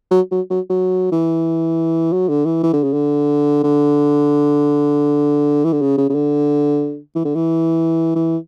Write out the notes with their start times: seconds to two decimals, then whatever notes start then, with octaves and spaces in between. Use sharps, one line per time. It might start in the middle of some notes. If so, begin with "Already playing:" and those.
0.11 F#3
0.31 F#3
0.50 F#3
0.69 F#3
1.12 E3
2.12 F#3
2.29 D3
2.45 E3
2.63 E3
2.73 D3
2.83 C#3
2.93 D3
3.63 D3
5.65 E3
5.73 D3
5.81 C#3
5.98 C#3
6.09 C#3
6.14 D3
7.15 E3
7.25 D3
7.35 E3
8.15 E3